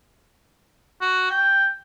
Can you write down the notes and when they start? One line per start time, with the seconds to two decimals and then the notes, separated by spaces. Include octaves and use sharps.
1.01 F#4
1.30 G5